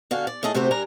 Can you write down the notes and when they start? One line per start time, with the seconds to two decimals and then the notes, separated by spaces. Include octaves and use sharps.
0.11 D3 F#4 F5 G#5
0.27 D5
0.43 A2 A3 G#4 D#5 A5
0.54 C3 A3 C4 F#4 G4 C5
0.71 G3 D4 A#4 G#5 A#5